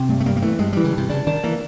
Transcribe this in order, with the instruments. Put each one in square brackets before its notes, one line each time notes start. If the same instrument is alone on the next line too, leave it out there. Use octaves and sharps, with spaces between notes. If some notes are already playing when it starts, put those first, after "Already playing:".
Already playing: [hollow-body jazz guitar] C3
[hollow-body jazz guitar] G2 [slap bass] A3
[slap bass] A3
[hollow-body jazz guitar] G2 [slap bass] A#3
[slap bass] A#3
[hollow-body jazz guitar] E3 [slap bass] A3
[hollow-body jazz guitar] G2 [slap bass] G#3
[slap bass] G3
[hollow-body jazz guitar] E3
[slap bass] C#3
[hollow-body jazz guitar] G2 [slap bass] C3
[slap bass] C#3 [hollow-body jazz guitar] D4
[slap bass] D#3 [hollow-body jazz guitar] D4
[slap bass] E3 [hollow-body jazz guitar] A#3